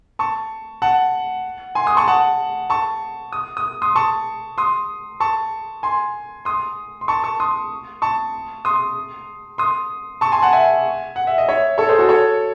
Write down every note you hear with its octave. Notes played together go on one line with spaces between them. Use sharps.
A5 C#6
F#5 A5
G#5 C6
C6 D#6
A5 C#6
F#5 A5
A5 C#6
D#6
D#6
C6 D#6
A5 C#6
C6 D#6
A5 C#6
G#5 C6
C6 D#6
C6
A5 C#6
A5 C#6
C6 D#6
A5 C#6
C6 D#6
C6 D#6
A5 C#6
G#5 C6
F#5 A5
E5 G#5
F#5
E5
D#5
C#5 E5
A4 C#5
G#4 C5
F#4 A4
A4 C#5